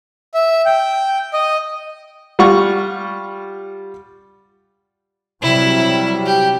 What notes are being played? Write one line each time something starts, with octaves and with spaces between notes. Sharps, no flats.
E5
G5
D#5
G3 F4 F#5 C#6
C3 F#3 G3 E4
G4